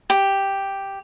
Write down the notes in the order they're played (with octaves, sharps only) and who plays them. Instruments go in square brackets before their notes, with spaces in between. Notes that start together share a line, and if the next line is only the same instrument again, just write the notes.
[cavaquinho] G4